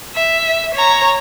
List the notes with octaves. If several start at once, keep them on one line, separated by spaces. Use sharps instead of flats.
E5
C#5 A#5